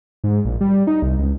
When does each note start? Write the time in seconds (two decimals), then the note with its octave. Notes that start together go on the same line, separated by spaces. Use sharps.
0.24 G#2
0.45 A#1
0.61 G3
0.87 D#4
1.02 C2
1.19 C#2